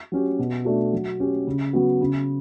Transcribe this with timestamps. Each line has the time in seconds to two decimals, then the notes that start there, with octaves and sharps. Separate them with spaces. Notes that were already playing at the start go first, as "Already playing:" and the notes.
0.12 F#3 C#4 G4
0.39 B2
0.65 A3 D4 F#4
0.93 F#3
1.20 C#4 G4
1.47 C#3
1.73 F#3 B3 F#4
2.01 C#3